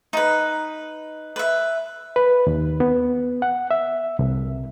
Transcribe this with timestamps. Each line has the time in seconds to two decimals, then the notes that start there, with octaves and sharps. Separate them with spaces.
0.13 D#4 B4
1.36 B4 E5
2.16 B4
2.47 D#2
2.80 B3
3.42 F#5
3.71 E5
4.19 C2